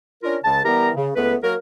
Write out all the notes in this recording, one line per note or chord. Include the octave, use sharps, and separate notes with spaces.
C#4 D4 F4 A#4
C#2 C#3 A5
E3 G3 B3 G4 A#4 A#5
C#3
C#2 A3 B3 B4
F#3 A#3 F#4 A#4